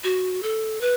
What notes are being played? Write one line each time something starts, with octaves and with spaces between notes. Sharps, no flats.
F#4
A4
B4